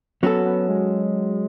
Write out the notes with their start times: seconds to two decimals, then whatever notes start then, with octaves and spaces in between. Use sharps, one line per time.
0.22 F#3 B3 C#4 F#4 A4
0.45 B3
0.69 G#3